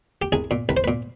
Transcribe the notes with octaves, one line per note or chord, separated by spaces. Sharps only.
G4
C2 G#4
A#2
C2 B4
C5
B4
A#2